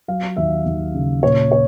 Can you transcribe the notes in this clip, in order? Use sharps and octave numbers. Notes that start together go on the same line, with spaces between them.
F#3 F5
D#2 E5
D#2
C#3
A#2 C#5
C#5